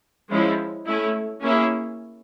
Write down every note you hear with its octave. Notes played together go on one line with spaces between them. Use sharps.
F3 G#3 C#4 E4
A3 C#4 E4
A#3 C#4 E4 G#4